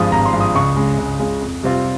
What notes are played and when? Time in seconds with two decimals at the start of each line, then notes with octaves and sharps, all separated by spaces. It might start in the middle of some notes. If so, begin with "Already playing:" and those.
Already playing: G#1 G2 F3 G#3 D#6
0.12 G#1 A#5
0.25 C6
0.33 G2 F3 G#3
0.40 D#6
0.55 C#2 C#6
0.76 C#3 G#3
0.98 C#2
1.19 C#3 G#3
1.41 F2
1.63 C3 G3 C4 F4